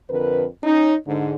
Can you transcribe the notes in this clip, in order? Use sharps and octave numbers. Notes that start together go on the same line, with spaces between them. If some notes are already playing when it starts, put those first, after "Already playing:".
F2 D3 A#4 B4
C#4 D#4
G#2 D3